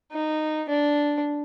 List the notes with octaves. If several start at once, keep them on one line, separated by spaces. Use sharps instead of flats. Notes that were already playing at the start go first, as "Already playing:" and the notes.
D#4
D4